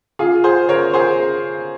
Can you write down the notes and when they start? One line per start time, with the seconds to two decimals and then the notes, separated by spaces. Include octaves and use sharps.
0.19 F4 G#4
0.44 G#4 C5
0.69 A#4 C#5
0.94 G#4 C5